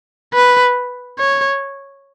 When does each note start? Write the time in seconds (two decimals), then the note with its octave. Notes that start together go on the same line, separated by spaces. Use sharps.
0.34 B4
1.19 C#5